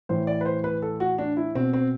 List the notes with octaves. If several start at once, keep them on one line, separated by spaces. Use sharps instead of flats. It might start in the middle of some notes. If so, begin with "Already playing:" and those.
A2 E3 C5
D5
B4
C5
B4
A4
F#4
D4
E4
B2 C4
C4